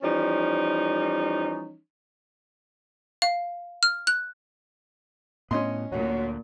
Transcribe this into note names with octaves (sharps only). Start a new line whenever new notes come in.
E3 F3 G3 C#4 D#4
F5
F6
F#6
A2 B3 C#4 D#5 C6
D2 A#2 F#3